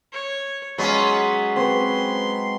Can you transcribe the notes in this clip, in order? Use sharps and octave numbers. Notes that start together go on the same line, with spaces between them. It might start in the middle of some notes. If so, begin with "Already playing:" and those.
C#5
F#3 G#3 B3 C#4 C6
C4 B4 C6